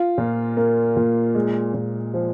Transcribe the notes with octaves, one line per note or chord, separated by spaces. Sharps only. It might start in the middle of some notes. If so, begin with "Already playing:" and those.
Already playing: F4
A#2
A#3
A#2
G#3
A#2
F3